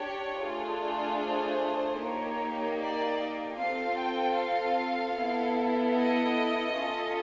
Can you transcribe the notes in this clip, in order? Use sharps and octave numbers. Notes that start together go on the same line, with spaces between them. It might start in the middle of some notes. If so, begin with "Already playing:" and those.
Already playing: D4 G4 C#5
A3 D4 F4 G#4
C5
A#3 D#4 G4 C#5
D5
C4 F4 A4 F5
G5
F5
B3 E4 A4
D#5
C#4 F4 A4